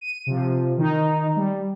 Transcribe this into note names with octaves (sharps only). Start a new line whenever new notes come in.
D#7
C3 F3
D#3 D#4
G3